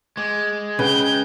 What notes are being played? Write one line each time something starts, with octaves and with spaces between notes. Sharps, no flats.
G#3 D6
C#3 B4 F#5 G5 G6